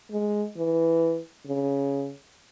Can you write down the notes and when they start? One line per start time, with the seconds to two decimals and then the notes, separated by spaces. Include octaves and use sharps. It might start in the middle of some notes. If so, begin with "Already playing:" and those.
0.12 G#3
0.57 E3
1.48 C#3